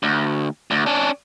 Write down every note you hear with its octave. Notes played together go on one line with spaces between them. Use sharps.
D2
D2
C#4 D4